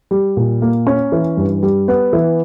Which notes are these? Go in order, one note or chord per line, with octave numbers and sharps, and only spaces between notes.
G3
A#2
A#3
C#4
E3
G2
G3
B3
E3